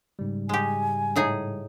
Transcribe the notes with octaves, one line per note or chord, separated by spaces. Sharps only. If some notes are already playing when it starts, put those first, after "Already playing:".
G#2 C#3 G3
G#3 G4 G#5
A2 D#4 G#4